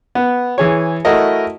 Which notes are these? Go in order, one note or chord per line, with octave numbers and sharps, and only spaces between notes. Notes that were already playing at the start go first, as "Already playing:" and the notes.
B3
E3 G#4 C#5
A3 E4 F#4 A#4 D#5